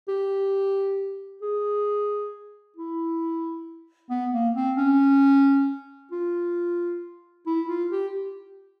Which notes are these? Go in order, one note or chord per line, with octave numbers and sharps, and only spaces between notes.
G4
G#4
E4
B3
A#3
C4
C#4
F4
E4
F4
G4